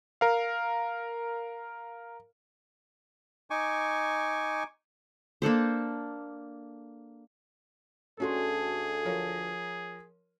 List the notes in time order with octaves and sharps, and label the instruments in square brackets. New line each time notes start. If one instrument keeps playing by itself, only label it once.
[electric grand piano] A#4 F5
[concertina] D#4 G#5 C#6 D6
[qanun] A#3 D4 A4 C5
[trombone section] D2 A4 [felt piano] C#4 F#4 C6 [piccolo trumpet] G#4
[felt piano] F3 A#4 C#5